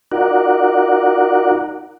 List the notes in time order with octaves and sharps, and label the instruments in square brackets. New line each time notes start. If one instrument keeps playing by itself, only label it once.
[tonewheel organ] D#4 F4 F#4 A#4 D5 F#5